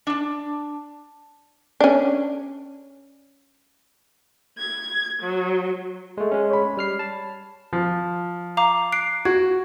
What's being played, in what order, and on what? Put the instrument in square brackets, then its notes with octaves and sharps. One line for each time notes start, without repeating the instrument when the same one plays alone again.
[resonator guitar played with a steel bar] D4 A5
[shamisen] C#4 D4
[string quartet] G#6
F#3
[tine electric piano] G#3 A3
G#3 C#4
[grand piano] C#5 B5
[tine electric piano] G3 F6 C7
A5
[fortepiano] F3
[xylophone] F5 A#5 D6
F#6 C7 D7
[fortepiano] F#4 [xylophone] G#6